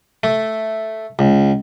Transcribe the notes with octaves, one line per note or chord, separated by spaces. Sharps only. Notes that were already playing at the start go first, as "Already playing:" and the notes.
A3
C#2